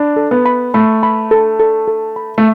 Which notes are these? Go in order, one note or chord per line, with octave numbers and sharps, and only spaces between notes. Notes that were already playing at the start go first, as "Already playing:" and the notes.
Already playing: D4 B5
A4
B3
B5
A3 B5
B5
A4
A4
A4
B5
A3